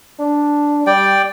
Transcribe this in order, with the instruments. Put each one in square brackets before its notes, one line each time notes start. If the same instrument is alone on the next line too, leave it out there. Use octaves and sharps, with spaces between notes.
[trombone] D4
[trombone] G3 [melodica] D5 G5